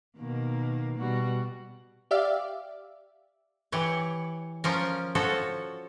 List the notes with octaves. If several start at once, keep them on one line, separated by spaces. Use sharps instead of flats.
B2 D#3 A#3
B2 G3 F#4
G4 D5 E5 F5
E3 G4 C#5
F3 C#4 A#4
F3 F#4 A4 C#5